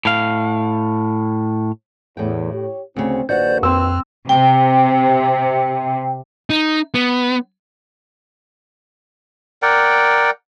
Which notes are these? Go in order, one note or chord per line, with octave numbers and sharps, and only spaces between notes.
A2 F5
E2 A2 G5
G4 C#5
D2 C#3 C4
A#1 D#2 F#4 B4 C5 D5 F#5 G6
F2 C4 E6
C3 G5
D#4
B3
A#4 D5 F#5 G5